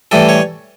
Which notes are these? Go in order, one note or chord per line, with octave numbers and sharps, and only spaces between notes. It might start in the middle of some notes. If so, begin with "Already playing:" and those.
A2 E3 G3 A4
C#5